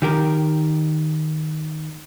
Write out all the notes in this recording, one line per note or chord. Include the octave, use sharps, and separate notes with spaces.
D#3 G4 A#4